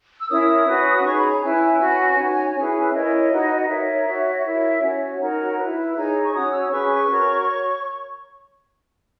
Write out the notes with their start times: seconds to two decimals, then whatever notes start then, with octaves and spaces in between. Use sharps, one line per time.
0.19 E6
0.29 C#4 E4 A#4 C#5 D#6
0.66 C#4 F#4 B4
1.04 D#4 G#4 C#5 C#6
1.17 B5
1.30 A#5
1.42 C#4 E4 B4 G#5
1.80 C#4 F#4 B4
2.18 D#4 F#4 C#5
2.55 C#4 E4 G#4 B4
2.93 E4 A#4 C#5 D#5
3.32 D#4 F#4 B4
3.69 D#4 A#4 C#5 E5
4.07 F#4 C#5
4.44 E4 A#4 C#5 E5
4.82 C#4 F#4 C#5
5.20 D#4 F#4 A#4 C#5
5.58 E4 B4
5.95 D#4 G#4 C#5
6.23 C#6
6.33 C#4 F#4 C#5 D#6
6.51 E6
6.70 C#4 G#4 B4 C#6
7.08 F#4 A#4 C#5
7.46 C#5